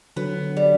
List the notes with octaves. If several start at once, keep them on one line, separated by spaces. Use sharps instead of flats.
D3 F#3 B3
G3